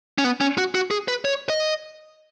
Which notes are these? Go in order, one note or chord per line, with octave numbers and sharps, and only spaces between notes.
C#4
B3
C#4
F#4
F#4
G#4
B4
C#5
D#5